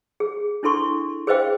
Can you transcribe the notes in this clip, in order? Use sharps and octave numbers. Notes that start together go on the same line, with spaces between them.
G#4
D4 E4 A4 C6 C#6
G#4 B4 C5 D#5 F5 G5